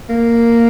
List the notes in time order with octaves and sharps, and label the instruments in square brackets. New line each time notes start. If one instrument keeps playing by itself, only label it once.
[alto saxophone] A#3